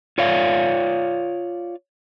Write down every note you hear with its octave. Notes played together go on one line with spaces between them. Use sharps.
F4 C#5 D5 F5